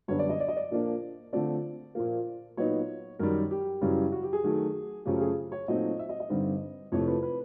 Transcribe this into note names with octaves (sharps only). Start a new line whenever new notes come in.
F#2 D3 G3 B3 D4 C#5
D5
D#5
D5
D#5
D5
A#2 F3 A#3 D4
D3 F3 A3 C4 D5
A#2 F3 A#3
A#2 F#3 B3 D#4 C#5
F#2 D#3 G3 A#4
G4
F#2 C#3 E3 G3
F#4
G4
G#4
D#3 F#3 A3
F#2 C#3 F3 A3 C#4 G4
G#4
C#5
A#2 F#3 A3 C4 D#4 D#5
E5
D#5
D#5
G2 D3 G3 C4 D#4
F2 C3 E3 A3 C#5
B4
B4